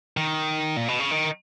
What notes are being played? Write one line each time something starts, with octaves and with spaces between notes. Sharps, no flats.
D#3
A#2
B2
C#3
D#3